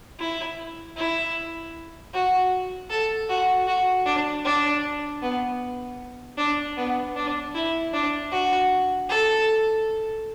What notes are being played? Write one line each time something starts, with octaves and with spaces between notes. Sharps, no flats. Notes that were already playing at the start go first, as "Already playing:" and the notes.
E4
E4
F#4
A4
F#4
F#4
D4
D4
B3
D4
B3
D4
E4
D4
F#4
A4